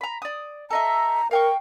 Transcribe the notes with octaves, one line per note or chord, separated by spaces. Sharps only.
A#5 B5
D5 D#6
A4 D#5 E5 A#5
A#4 F5 G5 C#6